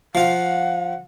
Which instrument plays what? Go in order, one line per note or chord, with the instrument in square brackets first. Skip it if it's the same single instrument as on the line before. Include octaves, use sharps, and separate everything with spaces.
[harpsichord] F3 F4 [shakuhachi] F#5